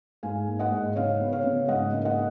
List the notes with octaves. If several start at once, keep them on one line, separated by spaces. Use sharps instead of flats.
G#2 F5 G#5
A#3
D#5 F#5
G#2
C#3 C#5 F5
B3
C#5 F5
C#3
G#2 D#5 F#5
A#3
D#5 F#5